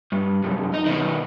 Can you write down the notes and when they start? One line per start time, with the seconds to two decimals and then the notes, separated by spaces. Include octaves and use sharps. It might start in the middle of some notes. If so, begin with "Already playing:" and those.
0.12 G2
0.44 C2 F#2
0.73 D#4
0.86 B2 D#3